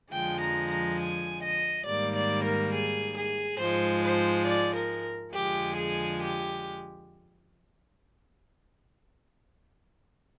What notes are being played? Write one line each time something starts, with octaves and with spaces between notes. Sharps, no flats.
F2 D3 F3 G#3 G5
A#5
A#5
G#5
D#5
G#2 D#3 G3 A#3 D5
D5
A#4
G#4
G#4
G#2 F3 G#3 C5
C5
D5
A#4
F2 D3 F3 G#3 G4
G#4
G4